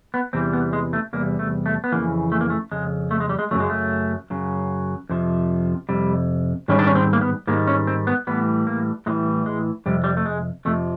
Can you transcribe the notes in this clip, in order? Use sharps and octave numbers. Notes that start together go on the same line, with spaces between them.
B3
E2 C3 E3 G3 C4
B3
G#3
A3
E2 C3 G3 A#3
A3
A3
B3
F2 C#3 E3 A#3
A3
A#3
A3
F2 C#3 G#3
A3
G#3
G3
G#3
F#2 C#3 F#3 A3
G#3
A3
F#2 C#3 F#3
F2 C3 F3
F2 C3 G3
G#2 D#3 G3 C#4
D4
C#4
C4
A#3
B3
G#2 D#3 G3 A#3
C#4
C4
B3
A2 E3 G3 B3
A#3
A2 E3 G3 G#3
G#3
F2 C3 G3
G3
A3
G#3
F2 C3 F3 A3